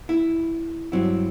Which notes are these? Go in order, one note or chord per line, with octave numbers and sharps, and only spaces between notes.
E4
G2 F#3 C4 E4